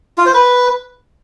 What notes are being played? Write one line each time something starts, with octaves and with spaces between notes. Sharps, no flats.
F4
C5
B4